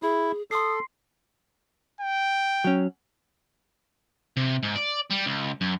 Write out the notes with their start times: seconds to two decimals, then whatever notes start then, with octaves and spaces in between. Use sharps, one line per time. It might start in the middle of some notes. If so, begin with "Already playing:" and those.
0.03 E4 G#4
0.51 A4 C6 D#6 C7
2.01 G5
2.64 F#3 C#4
4.37 C3
4.63 G#2
4.76 D5
5.11 G3
5.26 C#2
5.61 F#2